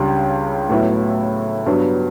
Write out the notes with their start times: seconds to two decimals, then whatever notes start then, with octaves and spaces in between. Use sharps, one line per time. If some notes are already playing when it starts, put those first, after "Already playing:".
Already playing: C#2 C#3 G3 D4
0.69 A2 F#3 B3 E4
1.66 G2 F#3 B3